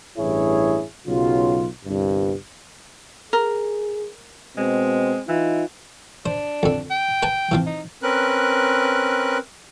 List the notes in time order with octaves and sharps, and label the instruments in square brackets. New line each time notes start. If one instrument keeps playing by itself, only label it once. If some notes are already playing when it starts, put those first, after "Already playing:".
[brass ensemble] A1 G2 E4 G#4 C#5
B1 C#3 F#3 F4
G1 C2 G2
[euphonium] G#4 [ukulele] A#4
[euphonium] B2 [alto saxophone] G#3 [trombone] C4
[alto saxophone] E3 [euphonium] D#4 [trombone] F4
[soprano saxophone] D4 [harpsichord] C5
[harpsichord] F2 D3
[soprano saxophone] G5
[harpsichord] B4 G#5 A5
E3 F3 C4
[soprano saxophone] D#4
[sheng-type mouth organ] C4 C#4 A#4 B4 F#6